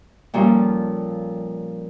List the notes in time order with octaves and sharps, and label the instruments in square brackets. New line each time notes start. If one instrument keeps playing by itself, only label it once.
[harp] A#2 F3 G3 C#4 A4